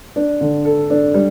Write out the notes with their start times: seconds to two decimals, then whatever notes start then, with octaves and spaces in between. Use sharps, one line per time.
0.16 D4
0.41 D3
0.65 A4
0.90 D4
1.14 G3